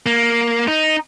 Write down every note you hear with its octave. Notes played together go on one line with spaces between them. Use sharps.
A#3
D#4